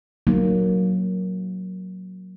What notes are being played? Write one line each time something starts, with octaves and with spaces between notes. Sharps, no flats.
F#3 A#3 D#4